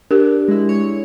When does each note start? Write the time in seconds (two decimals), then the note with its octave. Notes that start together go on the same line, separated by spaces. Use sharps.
0.11 D4 G4 A#4
0.48 G#3 E4
0.69 C#5